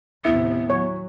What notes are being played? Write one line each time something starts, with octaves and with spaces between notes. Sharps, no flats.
D#2 A2 C3 B3 E4
F#3 C#5